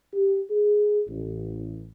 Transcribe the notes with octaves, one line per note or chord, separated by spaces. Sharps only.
G4
G#4
A1